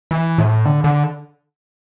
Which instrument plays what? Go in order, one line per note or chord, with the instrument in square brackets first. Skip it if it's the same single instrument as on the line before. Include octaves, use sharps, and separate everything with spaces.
[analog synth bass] E3
A2
D3
D3